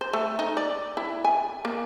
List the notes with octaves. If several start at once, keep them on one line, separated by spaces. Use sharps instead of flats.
C5
A3
D#4
D5
E4
G#5
A#3